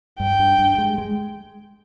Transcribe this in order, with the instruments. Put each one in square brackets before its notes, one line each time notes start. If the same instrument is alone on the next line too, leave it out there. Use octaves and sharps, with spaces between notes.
[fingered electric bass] G2 [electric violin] G5
[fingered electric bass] G2
G2
G#3
G#3